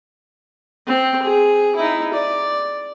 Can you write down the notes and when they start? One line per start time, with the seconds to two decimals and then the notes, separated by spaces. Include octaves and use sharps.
0.87 C4 C5
1.22 G#4
1.76 D#4 E4
2.14 D5